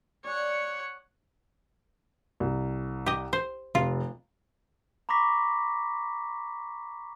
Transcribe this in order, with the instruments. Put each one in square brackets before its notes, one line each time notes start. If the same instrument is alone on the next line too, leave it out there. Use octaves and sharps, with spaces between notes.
[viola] C#5 F#5 [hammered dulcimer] D5 G#5
[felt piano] C2
[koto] G4 D#5
C5
[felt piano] F1 [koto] F4
[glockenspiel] A#5 B5 C#6 D6 A#6 B6